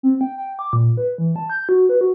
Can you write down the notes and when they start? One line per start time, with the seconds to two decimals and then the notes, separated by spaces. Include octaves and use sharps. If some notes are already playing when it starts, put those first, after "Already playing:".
0.03 C4
0.21 G5
0.38 G5
0.59 D6
0.73 A#2
0.97 B4
1.18 E3
1.36 A5
1.50 G6
1.69 F#4
1.89 B4
2.01 F#4